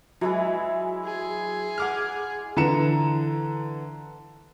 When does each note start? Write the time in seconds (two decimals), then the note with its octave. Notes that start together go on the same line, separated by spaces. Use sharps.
0.21 E3 F#3 G#3 E4
1.05 G#4
1.78 F#5 D6 F6
2.56 D3 E3 A#5 C#7 E7